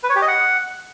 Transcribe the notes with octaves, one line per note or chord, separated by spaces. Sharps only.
B4
C#5
G4
D#5
F#5